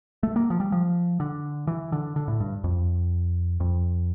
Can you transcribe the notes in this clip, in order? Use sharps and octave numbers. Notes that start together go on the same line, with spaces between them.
A3
A#3
F3
G3
F3
D3
E3
D3
D3
A2
G2
F2
F2